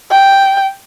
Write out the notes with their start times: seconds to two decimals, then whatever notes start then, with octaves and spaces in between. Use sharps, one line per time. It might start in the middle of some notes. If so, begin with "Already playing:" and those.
0.11 G5